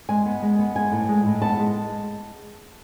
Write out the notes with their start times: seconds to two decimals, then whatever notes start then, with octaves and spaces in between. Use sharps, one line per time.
0.09 G#3 G#5
0.26 B3
0.42 G#3
0.59 B3
0.76 G#3 G#5
0.92 A2
1.09 G#3
1.26 A2
1.42 B3 A5
1.59 G#3